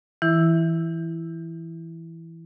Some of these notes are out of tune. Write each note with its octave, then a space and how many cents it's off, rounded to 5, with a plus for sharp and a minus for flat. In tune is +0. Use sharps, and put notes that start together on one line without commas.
E3 +0 E4 +5